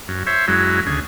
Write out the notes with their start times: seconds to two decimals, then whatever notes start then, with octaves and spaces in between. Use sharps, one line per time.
0.08 F#2
0.27 C5 C#5 E5
0.48 F#2 F#3 G#3 E4
0.86 D2 C#3 G#4